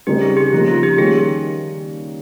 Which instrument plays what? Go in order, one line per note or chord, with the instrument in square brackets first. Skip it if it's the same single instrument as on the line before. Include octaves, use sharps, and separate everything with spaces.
[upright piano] C#3 G3 C4 D#4 A#4 [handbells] G4
[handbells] G#4
G4
[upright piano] C#3 F3 A#3 D#4 [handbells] F4
[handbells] F4
G4
[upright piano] D#3 G3 A#3 C#4 [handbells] G#4